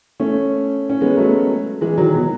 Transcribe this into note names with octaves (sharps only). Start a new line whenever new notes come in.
A3 C#4
C#4
G#3 B3
F#3 A3
E3 G#3
D#3 F#3
B2